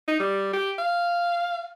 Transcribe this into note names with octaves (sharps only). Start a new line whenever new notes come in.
D#4
G3
G4
F5